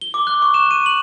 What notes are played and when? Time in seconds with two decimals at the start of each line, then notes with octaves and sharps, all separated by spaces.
0.01 G7
0.14 D6
0.27 F#6
0.42 C#6
0.54 E7
0.71 D#7
0.86 F#7